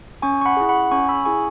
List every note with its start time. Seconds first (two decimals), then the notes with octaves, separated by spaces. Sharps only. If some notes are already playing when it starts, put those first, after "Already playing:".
0.22 C#4 G#5 C#6
0.41 C#6
0.46 F#5 B5
0.57 E4 G#4
0.69 F#5 B5
0.91 C#4 G#5 C#6
1.09 B5 E6
1.25 E4 G#4 G#5 C#6